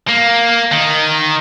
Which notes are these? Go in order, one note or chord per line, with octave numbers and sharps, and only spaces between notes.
A#3
D#3